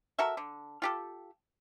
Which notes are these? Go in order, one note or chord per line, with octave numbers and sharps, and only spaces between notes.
F#4 A4 A#4 E5
D3
F4 G4 A4